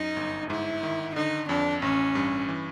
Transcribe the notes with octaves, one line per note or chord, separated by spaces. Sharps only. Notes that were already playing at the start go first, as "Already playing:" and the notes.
Already playing: F#2 D#4
G1
G#2 E4
D#3
D3 D#4
F2 D4
A1 C#4
G2
E3